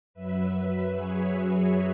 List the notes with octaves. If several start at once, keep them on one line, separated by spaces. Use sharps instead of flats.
F#2 F#3 B4 E5
B4 E5
G#4 C#5
F#4 B4